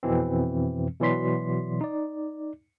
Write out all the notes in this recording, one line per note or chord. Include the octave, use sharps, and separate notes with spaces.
F2 B2 E3 C4
B2 E3 F#3 D5 C6 B6
D#4 D5